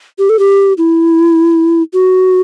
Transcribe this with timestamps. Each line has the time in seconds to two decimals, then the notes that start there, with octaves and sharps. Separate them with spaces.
0.19 G4
0.29 A4
0.39 G4
0.78 E4
1.94 F#4